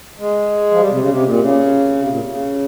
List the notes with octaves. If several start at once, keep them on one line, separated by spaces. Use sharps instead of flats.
G#3
F3
G3
C3
C#3
C3
A#2
C#3
C3
A#2
C#3